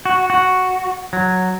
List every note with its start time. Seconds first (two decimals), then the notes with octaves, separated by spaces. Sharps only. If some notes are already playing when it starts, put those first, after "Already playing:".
0.05 F#4
0.30 F#4
1.13 F#3